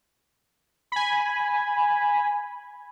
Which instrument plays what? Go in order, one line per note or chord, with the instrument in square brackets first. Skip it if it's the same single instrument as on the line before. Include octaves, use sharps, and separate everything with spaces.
[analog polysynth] G#5 B5